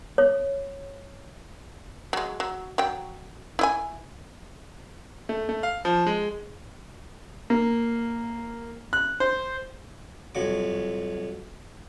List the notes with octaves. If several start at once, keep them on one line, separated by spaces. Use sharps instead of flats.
C#5
F#3 G#3
F#3
F#3 G5
E4 D#5 G#5
A3
A3
F5
F3
G#3
A#3
F#6
C5
C2 F2 F#3 D6